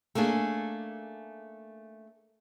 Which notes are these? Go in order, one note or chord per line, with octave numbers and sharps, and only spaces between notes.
A3 A#3 C#4 D4 G#4